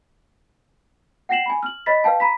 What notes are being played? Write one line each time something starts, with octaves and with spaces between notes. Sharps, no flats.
F#5 G5 A#6 C7 E7 F#7
G#5 B5
F6 F#7
C#5 D#5 B5 A6 B6
B4 F5 G5 A5
A#5 B5 B6